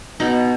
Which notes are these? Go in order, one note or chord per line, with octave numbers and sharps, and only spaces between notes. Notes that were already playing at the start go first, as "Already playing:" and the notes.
B2 D#4